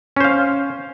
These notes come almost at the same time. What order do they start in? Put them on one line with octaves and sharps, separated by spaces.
C#4 C5 F5